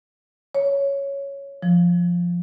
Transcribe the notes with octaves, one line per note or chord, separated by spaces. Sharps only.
C#5
F3